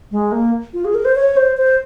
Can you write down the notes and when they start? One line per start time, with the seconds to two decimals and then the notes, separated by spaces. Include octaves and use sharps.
0.11 G#3
0.32 A#3
0.74 F4
0.85 G#4
0.95 A#4
1.05 C5
1.15 C#5
1.37 C5
1.57 C5